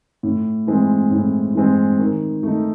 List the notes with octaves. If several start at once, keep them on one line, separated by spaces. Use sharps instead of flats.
A2
E3 G#3 C4
A2
E3 G#3 C4
D#3
A3 D#4